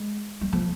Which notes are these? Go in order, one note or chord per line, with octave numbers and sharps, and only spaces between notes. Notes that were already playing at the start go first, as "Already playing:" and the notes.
Already playing: G#3
G3
F3